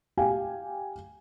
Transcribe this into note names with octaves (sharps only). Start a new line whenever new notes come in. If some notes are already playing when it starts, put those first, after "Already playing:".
G4 F5 G5 G#5